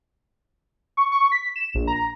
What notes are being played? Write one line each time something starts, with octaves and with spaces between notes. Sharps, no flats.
C#6
C#6
B6
E7
A#1
A#5